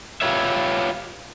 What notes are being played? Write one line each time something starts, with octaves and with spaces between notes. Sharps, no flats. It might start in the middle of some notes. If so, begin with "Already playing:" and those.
F4 G4 B4 C#5 E5